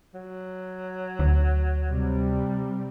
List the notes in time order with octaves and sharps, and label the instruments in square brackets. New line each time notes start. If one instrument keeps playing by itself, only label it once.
[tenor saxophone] F#3
[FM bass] D2
[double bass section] C3 G3